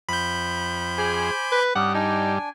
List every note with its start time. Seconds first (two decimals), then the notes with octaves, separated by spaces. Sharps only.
0.09 F2 B5 G6
0.98 G#4 C5 G#5 D6
1.52 B4
1.75 G2 G3 C#4 D#4 G4 F#5
1.94 D4 D#4 G#5